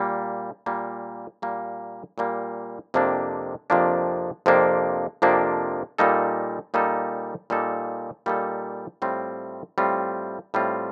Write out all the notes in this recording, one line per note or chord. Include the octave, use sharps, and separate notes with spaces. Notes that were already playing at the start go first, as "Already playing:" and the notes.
Already playing: A#2 G3 A#3
A#2 G3 A#3
A#2 G3 A#3
A#2 G3 A#3
F2 C3 F3 A#3 D4
F2 C3 F3 A#3 D4
F2 C3 F3 A#3 D4
F2 C3 F3 A#3 D4
A#2 G3 A#3 D#4 A4
A#2 G3 A#3 D#4 A4
A#2 G3 A#3 D#4 A4
A#2 G3 A#3 D#4 A4
A2 G3 C4 F4
A2 G3 C4 F4
A2 G3 C4 F4